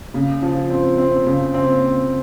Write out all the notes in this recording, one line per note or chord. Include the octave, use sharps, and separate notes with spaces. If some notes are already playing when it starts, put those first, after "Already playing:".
C#3
F3
C4
C4
C#3
C4